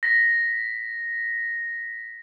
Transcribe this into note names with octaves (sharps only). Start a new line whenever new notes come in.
A#6 B6